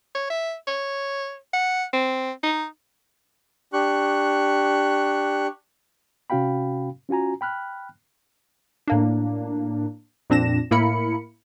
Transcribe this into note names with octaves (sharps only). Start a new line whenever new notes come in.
C#5
E5
C#5
F#5
C4
D#4
D4 G4 C#6 F#6
C3 C#4 F#4 F5 G5 B5
C#4 F4 F#4 G#5 A#5
G5 B5 F6 F#6
A2 A#3 D4
F2 A#2 C4 D4 A#6 E7
A2 A#3 E4 A#4 B5 C#7